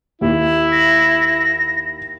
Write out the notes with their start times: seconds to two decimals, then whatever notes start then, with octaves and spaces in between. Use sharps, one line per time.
0.21 D#2 E4
0.72 A#6